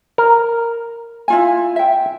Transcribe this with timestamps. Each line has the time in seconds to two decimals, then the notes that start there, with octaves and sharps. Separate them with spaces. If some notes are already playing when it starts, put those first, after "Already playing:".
0.18 A#4
1.28 E4 F4 G#5
1.76 E5 G5